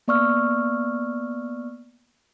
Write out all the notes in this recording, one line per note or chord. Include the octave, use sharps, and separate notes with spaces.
A#3 B3 D5 C#6 E6 F6